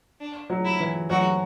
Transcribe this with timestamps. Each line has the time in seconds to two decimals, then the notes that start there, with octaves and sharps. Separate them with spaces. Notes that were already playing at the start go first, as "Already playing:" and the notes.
0.20 D4
0.50 F#3
0.65 E4
0.80 E3
1.10 F#3 F#4